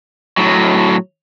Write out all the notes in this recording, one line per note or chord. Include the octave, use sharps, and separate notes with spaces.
A2 F#3